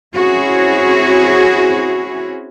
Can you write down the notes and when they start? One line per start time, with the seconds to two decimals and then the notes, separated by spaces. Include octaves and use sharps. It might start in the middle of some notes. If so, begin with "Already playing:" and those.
0.15 C4 C#4 E4 F#4 G#4 C#5